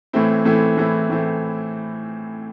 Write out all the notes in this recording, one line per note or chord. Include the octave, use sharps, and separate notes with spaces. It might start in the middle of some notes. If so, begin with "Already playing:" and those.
A2 E3 A3 C4 E4
A2 E3 A3 C4 E4
A2 E3 A3 C4 E4
A2 E3 A3 C4 E4